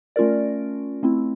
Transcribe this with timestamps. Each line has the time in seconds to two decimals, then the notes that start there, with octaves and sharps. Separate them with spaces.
0.16 A3 C#4 F4 A#4 D5
1.03 A3 C4 E4